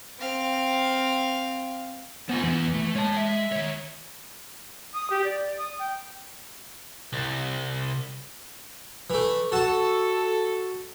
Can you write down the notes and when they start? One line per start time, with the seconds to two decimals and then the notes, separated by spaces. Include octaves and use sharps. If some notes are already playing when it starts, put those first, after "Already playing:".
0.20 C4 F5
2.29 B3 F4 C5 G#5
2.43 E2 E3 B3
2.74 A3
2.96 G#3 C#5 A5
3.17 E5
3.52 D#3 C#5
4.94 D#6
5.10 G4
5.24 D5
5.58 D#6
5.79 G5
7.13 C2
9.10 E3 A3
9.52 F#4 A4 A5